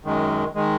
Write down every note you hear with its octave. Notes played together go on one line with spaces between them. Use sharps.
F#2 D#3 G#3
D#3 G#3